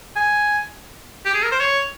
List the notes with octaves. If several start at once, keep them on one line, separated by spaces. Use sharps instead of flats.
G#5
G4
G#4
A#4
C5
C#5